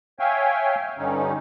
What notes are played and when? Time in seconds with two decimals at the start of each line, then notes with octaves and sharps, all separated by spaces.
0.19 C#5 E5 F5 G5 G#5
0.98 G2 D3 C#4 D#4